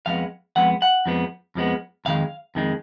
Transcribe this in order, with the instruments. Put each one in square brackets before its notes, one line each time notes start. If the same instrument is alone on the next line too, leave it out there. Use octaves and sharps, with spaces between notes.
[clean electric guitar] F2 F3 G#3 B3 F5
F2 F3 G#3 B3 F#5
F#5
F2 F3 G#3 B3
F2 F3 G#3 B3
F2 D#3 G#3 F5
F2 D#3 G#3